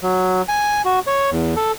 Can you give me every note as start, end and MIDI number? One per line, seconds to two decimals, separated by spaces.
0.03 0.42 54
0.49 0.82 80
0.85 0.99 66
1.07 1.30 73
1.32 1.54 40
1.56 1.72 69